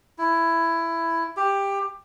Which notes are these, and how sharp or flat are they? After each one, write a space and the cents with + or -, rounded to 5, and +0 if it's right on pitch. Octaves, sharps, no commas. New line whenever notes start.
E4 +10
G4 +15